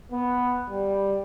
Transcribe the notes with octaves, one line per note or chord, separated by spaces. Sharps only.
B3
G3